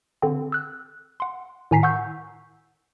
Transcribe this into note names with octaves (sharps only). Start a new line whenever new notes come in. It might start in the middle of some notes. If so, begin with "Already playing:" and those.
D3 C4
E6 F#6
F#5 C6
A2 D#3 G#5 A#5 B6 C7
F#5 C#6 E6 G6